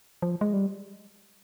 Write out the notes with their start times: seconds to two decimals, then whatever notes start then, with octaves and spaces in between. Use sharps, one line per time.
0.22 F3
0.41 G#3
0.53 G3